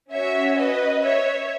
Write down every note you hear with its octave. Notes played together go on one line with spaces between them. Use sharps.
C#4 F#4 C#5 E5
B4 D#5
C#5 E5